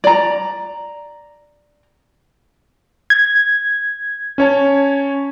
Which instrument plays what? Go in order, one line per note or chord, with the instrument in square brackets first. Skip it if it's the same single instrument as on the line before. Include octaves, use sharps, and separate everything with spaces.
[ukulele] D5 A#5
[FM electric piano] G#6
[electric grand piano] C#4 C#5 A5